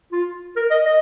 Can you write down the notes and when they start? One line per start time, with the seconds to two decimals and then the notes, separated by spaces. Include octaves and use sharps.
0.12 F4
0.56 A#4
0.71 D#5
0.86 D#5